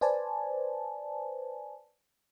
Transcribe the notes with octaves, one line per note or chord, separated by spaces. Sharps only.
B4 C5 D5 G#5 A5